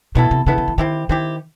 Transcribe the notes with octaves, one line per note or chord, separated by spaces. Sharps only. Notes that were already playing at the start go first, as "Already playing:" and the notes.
B2 B3 E4 A4
C3
C#3 B3 E4 A4
C#3
E3
D#3 C4 E4 G4
D#3 C4 E4 G4